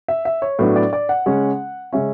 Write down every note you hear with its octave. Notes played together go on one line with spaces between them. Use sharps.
E5
E5
C#5
A2 F#3 B3 D4
D5
D5
F#5
C#3 G#3 C#4
C#3 G#3 C#4 E5